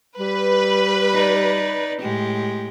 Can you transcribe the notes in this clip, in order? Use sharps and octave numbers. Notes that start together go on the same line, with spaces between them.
G3 B4
D#4 D5
A2 G#3 G4